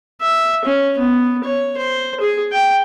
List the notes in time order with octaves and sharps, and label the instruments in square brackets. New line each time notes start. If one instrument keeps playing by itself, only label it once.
[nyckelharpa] E5
C#4
B3
C#5
C5
G#4
G5